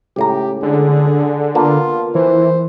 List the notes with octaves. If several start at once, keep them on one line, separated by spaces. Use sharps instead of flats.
C#2 A2 G4 A#5
D3 G#4
A#3 B3 F4 A5
E3 C5